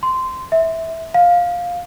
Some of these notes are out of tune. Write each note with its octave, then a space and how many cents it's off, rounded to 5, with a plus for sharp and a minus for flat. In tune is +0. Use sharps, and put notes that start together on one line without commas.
C6 -15
E5 -15
F5 +10